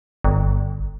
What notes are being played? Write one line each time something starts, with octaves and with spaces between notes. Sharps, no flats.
G1